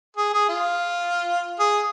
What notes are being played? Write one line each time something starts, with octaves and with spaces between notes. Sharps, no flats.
G#4
G#4
F4
G#4